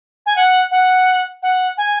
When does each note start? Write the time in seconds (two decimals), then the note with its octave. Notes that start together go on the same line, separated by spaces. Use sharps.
0.26 G#5
0.36 F#5
0.71 F#5
1.43 F#5
1.77 G#5